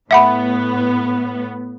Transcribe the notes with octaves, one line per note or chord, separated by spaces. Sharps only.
A2 B3 E5 F#5 B5